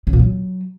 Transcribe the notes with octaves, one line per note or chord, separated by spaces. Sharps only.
C#3
A#2
F#3